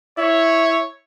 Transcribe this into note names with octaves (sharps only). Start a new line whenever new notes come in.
E4 C#5